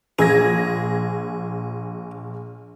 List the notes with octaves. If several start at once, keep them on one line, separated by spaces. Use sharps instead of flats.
A#1 G#4 G#6 A#6